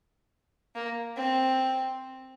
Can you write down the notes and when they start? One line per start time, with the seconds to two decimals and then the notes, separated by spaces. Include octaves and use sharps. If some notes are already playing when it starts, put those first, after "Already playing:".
0.75 A#3
1.17 C4